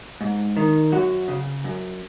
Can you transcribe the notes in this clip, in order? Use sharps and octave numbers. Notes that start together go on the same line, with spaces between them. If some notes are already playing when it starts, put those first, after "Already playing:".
G#2
D#3
F#2 F#4
C#3
F#2